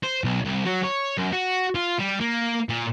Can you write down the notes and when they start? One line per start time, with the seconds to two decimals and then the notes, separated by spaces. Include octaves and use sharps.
0.03 C5
0.24 B1
0.45 C2
0.66 F#3
0.84 C#5
1.18 F#2
1.33 F#4
1.75 F4
1.99 G3
2.20 A#3
2.69 A#2